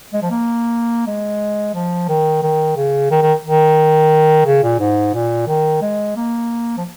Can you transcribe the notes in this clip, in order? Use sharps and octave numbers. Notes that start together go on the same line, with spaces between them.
G#3
F3
A#3
G#3
F3
D#3
D#3
C#3
D#3
D#3
D#3
C#3
A#2
G#2
A#2
D#3
G#3
A#3
F3